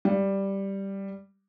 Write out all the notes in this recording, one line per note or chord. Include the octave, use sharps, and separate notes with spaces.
G3